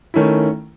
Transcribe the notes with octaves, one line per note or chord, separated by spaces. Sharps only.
D#3 A3 C#4 E4